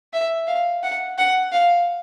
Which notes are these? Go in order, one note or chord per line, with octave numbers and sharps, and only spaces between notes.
E5
F5
F#5
F#5
F5